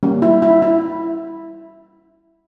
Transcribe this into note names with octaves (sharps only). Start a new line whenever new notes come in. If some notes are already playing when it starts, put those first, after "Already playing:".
G3 A#3 C#4
E4
E4
E4